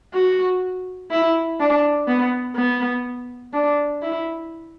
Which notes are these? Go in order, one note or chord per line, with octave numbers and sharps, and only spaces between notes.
F#4
E4
D4
B3
B3
D4
E4